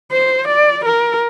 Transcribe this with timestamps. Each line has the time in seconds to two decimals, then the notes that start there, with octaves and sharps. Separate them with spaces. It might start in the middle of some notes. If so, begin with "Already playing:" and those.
0.11 C5
0.48 D5
0.85 A#4